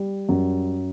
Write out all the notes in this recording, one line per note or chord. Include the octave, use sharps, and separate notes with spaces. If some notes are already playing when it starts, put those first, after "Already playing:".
Already playing: G3
F#2